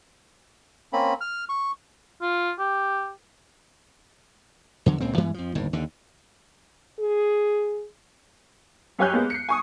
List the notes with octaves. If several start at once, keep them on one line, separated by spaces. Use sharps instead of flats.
A#3 C4 C#4 B5
F6
C#6
F4
G4
E2 D3 F#3
C#2 A#2 C#3 C4
G2 E3 G#3 B3
F2 F3
G1 D#2 A2
D#2 D3
G#4
F#2 G4 C#5 G#5 F#6 G6
G#3 A#3 B3
C7 C#7
G#5 C#6 D#6